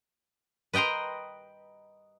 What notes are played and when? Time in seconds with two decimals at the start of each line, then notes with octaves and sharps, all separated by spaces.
0.73 B4 D#5 G5 A#5 C6